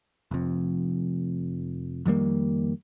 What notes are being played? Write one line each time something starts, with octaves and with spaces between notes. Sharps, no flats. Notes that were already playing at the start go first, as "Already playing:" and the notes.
F1 F2
F2 D#3 G3 A#3